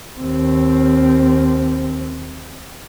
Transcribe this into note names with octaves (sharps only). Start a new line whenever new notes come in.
D#2 C4